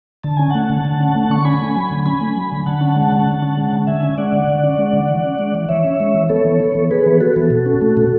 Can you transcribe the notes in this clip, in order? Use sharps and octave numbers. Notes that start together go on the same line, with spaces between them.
D3 A5
C#4 G#5
A3 F#5 A5
D3
D3
C#4
A3
D3 C#6
C#4 G#5 B5
A3
F#3
D3
C#4 G#5 B5
A3
F#3
D3
D3 F#5 A5
C#4
G#3
D3
D3
C#4
G#3
D3
D3 E5 G#5
C#4
G#3 D5 F#5
D3
D3
C#4
G#3
D3
E3
C#4
G#3
E3
E3 C#5 E5
C#4
G#3
E3
B3 A4 C#5
E3
B3
E3
B3 G#4 B4
E3 B4
B3 F#4 A4
E3
B2
C#4
A3
B2